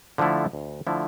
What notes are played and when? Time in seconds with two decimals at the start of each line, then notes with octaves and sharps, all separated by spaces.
0.18 D3 F3 A3 E4
0.53 D2
0.87 D3 F3 A3 E4